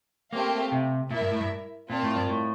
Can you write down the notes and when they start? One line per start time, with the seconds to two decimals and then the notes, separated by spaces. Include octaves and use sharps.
0.32 A3 A#3 C4 G4 C5 F5
0.72 C3
1.11 A#2 E4 A#4 E5
1.21 G2
1.31 A2
1.41 G2
1.90 A#2 C4 F4 A#4 D5 A5
2.03 A2
2.16 G2
2.29 A2